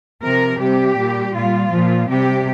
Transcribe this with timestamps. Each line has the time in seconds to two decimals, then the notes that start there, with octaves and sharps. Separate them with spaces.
0.22 C3 F3 A#4
0.59 C3 G3 G4
0.97 A#2 G3
1.34 A#2 G3 F4
1.72 A#2 F3
2.09 C3 G3 G4